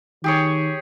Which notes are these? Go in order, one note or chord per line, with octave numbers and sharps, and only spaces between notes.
D#3 G4 G#4 C#5